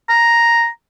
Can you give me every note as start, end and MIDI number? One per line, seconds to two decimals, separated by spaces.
0.09 0.68 82